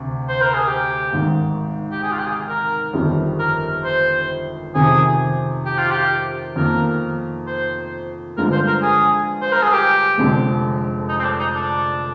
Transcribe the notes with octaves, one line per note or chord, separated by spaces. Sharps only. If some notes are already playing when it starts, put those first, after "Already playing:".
Already playing: D2 C3
C5
A#4
G#4
G4
G#1 G#2 D#3
G4
G#4
F4
G4
G#4
A#4
G1 F2 D#3 G3
A#4
C5
F2 C3 D#3 G#4
G4
F4
G4
F2 D#3 A#3 A#4
C5
G2 D3 F3 G#3 A#4
C5
A#4
G#4
C5
A#4
G#4
G4
F1 F2 D3 G#3
D#4
C4
D4
D#4
D4